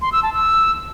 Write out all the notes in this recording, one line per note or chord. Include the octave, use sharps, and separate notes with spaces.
C6
E6
A5
E6